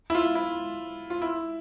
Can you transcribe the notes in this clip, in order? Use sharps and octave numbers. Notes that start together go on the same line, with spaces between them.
E4
F4
E4
F4
E4